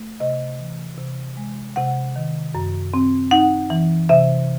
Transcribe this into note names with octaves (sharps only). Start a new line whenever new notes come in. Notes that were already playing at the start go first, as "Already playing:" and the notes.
Already playing: A3
C3 D#5
E3
C3
G#3
C3 F#5
D#3
F#2
C4
D#4 F#5
E3
C3 E5